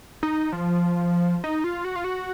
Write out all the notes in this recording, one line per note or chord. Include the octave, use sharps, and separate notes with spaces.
D#4
F3
D#4
F4
F#4
F4
F#4